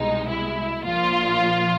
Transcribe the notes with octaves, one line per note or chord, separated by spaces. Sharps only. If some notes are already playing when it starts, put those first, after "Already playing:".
Already playing: C2 B2 G#3 D#4
E4
A#1 A#2 F3 F4